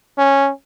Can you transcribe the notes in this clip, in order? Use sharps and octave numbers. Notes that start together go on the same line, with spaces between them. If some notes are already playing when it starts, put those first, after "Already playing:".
C#4